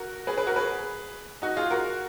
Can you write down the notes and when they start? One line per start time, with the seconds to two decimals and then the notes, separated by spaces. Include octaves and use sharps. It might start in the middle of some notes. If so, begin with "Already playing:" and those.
Already playing: F#4 A#4
0.27 G#4 B4
0.37 G#4 B4
0.47 F#4 A#4
0.56 G#4 B4
1.42 D#4 F#4
1.57 F4 G#4
1.71 F#4 A#4